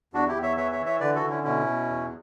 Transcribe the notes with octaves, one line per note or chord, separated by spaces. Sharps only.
E2 D4 F#4
E4 G4
E2
C#5 E5
E3 C#5 E5
C#5 E5
E3
C#5 E5
D3 B4 D5
F#4 A4
D3
C#4 E4
B2 C#4 E4
B2
E2